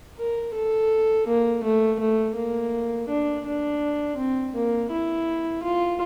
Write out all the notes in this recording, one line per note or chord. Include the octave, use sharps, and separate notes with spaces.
A#4
A4
A#3
A3
A3
A#3
D4
D4
C4
A#3
E4
F4